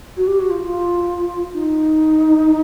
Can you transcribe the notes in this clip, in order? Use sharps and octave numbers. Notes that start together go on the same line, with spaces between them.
F#4
G4
F#4
F4
F4
D#4